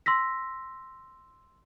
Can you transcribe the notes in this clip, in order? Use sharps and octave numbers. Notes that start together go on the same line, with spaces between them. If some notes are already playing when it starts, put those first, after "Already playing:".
C6 E6 A#6 B6